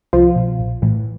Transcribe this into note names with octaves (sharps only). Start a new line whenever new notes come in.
C2 F3 F4
B2
A#1
A2 E3